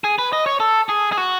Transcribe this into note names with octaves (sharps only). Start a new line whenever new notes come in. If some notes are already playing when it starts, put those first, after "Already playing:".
G#4
B4
D#5
C#5
A4
G#4
G#4
F#4